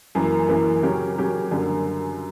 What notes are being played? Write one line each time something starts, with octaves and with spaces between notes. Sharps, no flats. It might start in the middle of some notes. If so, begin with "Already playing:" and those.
F#2 E3 A#3
F#2 E3 A#3
C#3 F#3 C#4 G4 A#4
C#3 F#3 C#4 G4 A#4
F#2 D3 G3 A#3